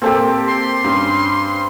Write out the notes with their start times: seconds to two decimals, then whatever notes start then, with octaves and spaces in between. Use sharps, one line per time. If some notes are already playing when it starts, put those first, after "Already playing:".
0.02 A#2 C4 G4 A4 A#4
0.47 C6
0.84 G2 C#4